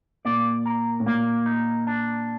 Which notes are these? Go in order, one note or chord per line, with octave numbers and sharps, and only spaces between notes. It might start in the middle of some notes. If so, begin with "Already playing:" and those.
A#2 D5
A#4
A2
A#2 A#3
D#4
D4